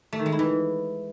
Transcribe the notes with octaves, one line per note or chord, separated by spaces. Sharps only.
A3
D#3
G#3
E4
E3